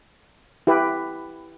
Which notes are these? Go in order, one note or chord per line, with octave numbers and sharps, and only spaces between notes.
E4 G4 B4